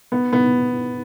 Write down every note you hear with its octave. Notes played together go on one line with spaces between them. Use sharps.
B3
B3